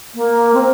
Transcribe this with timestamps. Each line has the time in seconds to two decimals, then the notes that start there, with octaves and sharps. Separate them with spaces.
0.15 A#3
0.54 C4